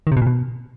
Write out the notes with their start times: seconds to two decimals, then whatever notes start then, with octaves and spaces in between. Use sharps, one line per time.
0.07 D#3
0.12 C3
0.17 B2
0.22 A#2
0.27 B2